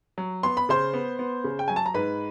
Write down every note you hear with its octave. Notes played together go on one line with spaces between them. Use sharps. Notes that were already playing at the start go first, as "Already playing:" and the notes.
F#3
B3 C6
B5
C#3 C5 C6
B3
B3
C#3
G5
F#3 G#5
A5
A#5
G#2 B4 B5